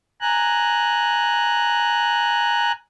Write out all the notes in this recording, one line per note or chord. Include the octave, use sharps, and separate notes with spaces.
G#5 A#5 F#6